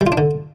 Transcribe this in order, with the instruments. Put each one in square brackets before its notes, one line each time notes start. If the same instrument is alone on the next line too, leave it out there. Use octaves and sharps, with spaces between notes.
[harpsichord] G3
F4
D4
D3